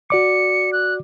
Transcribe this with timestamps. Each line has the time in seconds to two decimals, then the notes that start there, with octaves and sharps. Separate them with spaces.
0.10 F#4 D5 D6 C#7
0.73 F#6